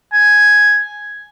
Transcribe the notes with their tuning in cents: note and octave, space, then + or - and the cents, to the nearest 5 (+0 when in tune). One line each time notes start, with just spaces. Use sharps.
G#5 +5